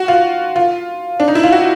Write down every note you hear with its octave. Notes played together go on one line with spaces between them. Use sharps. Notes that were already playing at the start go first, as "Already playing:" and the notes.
Already playing: F#4
F4
F4
D4
D#4
E4
F4
F#4